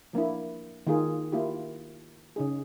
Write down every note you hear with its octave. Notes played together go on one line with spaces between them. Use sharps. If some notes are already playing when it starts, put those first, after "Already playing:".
F3 A#3 D4 E4
D#3 A#3 F4 G#4 A#4
A#3 E4 F4 G4
C#3 D#4 G#4